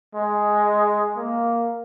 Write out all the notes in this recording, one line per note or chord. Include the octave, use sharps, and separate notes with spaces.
G#3
A#3